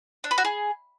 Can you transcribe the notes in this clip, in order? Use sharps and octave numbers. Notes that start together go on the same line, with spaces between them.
D4
B4
F#4
G#4